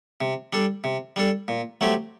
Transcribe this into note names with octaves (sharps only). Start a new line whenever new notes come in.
C3
G3 D4 A4
C3
G3 D4 A4
A#2
F#3 A3 C4 G4